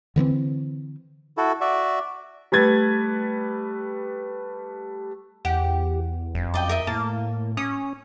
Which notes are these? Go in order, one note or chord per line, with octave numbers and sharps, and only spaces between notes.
D3 E3 A#3 C4
E4 F#4 A4
F#4 D5 E5
G3 A3 B4 G#6 A6
E2 G4 F#5
E1 F2
F#2 D5 D#5 G5
A#4 D#5 E5
A2 A#3 A5
C#4 D#6